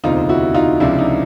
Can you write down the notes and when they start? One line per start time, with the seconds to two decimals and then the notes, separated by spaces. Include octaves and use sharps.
0.04 E1 D2 C3 D#4 F4
0.29 E4 F#4
0.54 D#4 F4
0.80 C#2 C3 F3 D4 E4
0.99 D#4